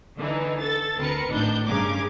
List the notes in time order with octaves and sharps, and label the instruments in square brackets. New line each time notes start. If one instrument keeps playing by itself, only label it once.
[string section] D3 E3 D#4
A4 A6
D2 C4 A#4 B4 C#7
G#1 A2 D4 D#4 G6
G2 C#3 A#4 D6 G#6